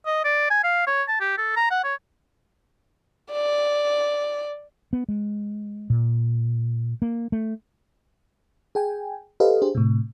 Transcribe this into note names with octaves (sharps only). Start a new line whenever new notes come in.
D#5
D5
G#5
F5
C#5
A5
G4
A4
A#5
F#5
C#5
D5
B3
G#3
A#2
A#3
A3
G#4 G5 G#5
G4 A4 B4 C5 D#5 F5
D4 G4 G#4 C5
A2 C3